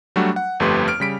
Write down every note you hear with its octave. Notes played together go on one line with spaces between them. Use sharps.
F#3 G3 A3 D4 F#4
F#5
G1 F2 A3 G4 B4 C6
F6 D7
C#3 G3 B6 D7